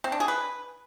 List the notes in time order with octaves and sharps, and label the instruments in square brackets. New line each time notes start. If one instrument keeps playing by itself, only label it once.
[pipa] C4
D4
G#4
B4